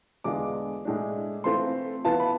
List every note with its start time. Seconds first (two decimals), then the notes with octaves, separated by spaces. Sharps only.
0.24 E2 D3 G#3 D4 F4 D6
0.85 A2 G#3 D4
1.44 E3 A3 C4 F4 C6
2.04 E3 B3 F4 A5
2.20 B5